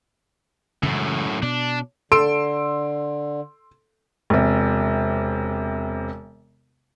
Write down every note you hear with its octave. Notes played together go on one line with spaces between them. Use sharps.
F#2 A2 C#3 E3 G#3
B2 D4
D3 A4 C6 E6 D7
E1 C3